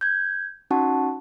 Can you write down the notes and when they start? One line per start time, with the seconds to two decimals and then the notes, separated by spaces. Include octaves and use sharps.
0.01 G6 G#6
0.71 C#4 D#4 F#4 F#5 A5 C#6